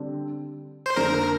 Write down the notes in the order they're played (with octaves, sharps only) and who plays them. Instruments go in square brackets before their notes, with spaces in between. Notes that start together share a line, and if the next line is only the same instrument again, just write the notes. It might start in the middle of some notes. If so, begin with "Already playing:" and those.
Already playing: [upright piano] D3 G3 C4
[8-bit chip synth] C5
[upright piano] F2 D3 F3 A#3 [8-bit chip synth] A#4